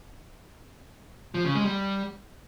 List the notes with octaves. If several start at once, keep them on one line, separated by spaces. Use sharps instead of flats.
F3
C#3
G#3
G3